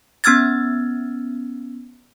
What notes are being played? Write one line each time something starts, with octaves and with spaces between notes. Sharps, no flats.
B3 C#4 E6 F6 G#6 A6